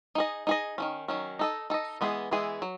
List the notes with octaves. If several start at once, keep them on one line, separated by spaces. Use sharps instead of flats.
D#4 G#4 D#5
D#4 G#4 D#5
D#3 F#3 C#4
D#3 F#3 C#4
D#4 A4 D#5
D#4 A4 D#5
E3 G#3 B3 E4 G#4
E3 G#3 B3 E4 G#4
F#3